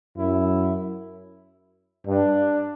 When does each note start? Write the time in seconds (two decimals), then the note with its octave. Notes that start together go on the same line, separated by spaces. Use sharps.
0.18 F#2 E4
2.07 G2 D4